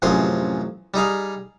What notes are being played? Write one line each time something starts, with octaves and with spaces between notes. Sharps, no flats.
A1 F#2 C3 F3 G#4 C6
G3 D#4 G#4 F5